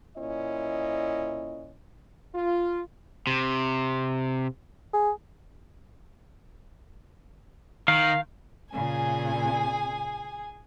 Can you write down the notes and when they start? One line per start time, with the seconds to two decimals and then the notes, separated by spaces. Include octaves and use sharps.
0.17 A#2 C#4 E4 D#5
2.35 F4
3.27 C3
4.94 G#4
7.88 D#3 F5
8.73 A#2 C#3 G#4 G#5